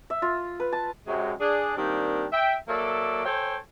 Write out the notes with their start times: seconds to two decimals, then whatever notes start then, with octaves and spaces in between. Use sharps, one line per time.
0.10 E5
0.22 F4
0.60 B4
0.73 A5
1.07 F#2 C3 F#3 G#3
1.40 D4 G#4
1.77 D#3 G3 A#3 C4 D4
2.32 E5 G5
2.68 F#3 A#3 A4 D5 E5
3.25 A4 C5 C#5 G5 G#5